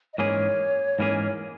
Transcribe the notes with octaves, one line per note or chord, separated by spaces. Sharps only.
D#5
G#2 E3 A#3 C#4 G#4 C#5
G#2 E3 A#3 C#4 G#4